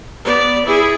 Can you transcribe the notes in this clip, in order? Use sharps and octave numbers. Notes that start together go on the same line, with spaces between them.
B3 D5
E4 G#4